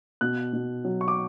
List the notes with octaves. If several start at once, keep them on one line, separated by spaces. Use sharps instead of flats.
B2 F#6
B2
F#3
C#6
D6